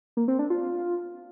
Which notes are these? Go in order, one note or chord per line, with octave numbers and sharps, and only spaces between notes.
A#3
C4
D4
F4